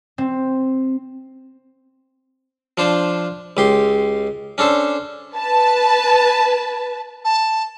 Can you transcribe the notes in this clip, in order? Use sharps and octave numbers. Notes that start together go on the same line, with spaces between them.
C4
F3 D4 C5
C#2 G4 C6
C#4 D4 A4 C5
B4 A5
A5